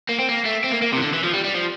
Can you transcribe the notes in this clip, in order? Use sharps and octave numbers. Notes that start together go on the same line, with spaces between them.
A#3
C4
A#3
A3
C4
A#3
A#3
C3
E3
D3
E3
F3
G3
G3
F3